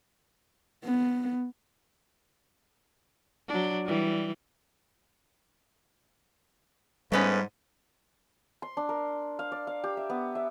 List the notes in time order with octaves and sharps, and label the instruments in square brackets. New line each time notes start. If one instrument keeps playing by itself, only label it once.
[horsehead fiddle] B3
[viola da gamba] F#3 D4
E3 G3
[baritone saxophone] G#2 [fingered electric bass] G3 [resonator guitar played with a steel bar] A3 B3 C#4
[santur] C6
D4
A#4
F5
D5
F5
G4
E5
B3
E5